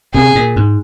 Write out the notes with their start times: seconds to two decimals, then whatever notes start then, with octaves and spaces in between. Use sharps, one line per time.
0.13 C3 G#4
0.35 A#2
0.56 G#2